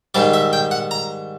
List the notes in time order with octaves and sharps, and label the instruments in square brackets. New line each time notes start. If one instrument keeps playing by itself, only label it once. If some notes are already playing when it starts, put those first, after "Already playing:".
[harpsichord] G#2 D#3 G3 D5
E5
G5
F#5
A#5